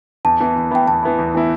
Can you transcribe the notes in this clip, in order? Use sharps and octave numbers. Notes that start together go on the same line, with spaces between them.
E2 A5
E3 B3 E4
E2
E3 B3 E4 G5
E2 A5
E3 B3 E4
E2
E3 B3 E4